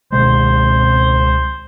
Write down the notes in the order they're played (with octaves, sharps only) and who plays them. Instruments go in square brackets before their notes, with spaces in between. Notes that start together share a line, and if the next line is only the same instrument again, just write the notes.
[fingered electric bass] C#2 B2 G#3 [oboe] C5